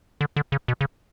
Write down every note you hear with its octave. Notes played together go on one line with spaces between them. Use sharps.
D3
D3
C#3
B2
C#3